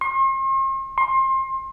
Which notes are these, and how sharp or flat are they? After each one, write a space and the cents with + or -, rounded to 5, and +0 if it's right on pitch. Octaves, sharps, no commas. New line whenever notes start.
C6 +45
C6 +30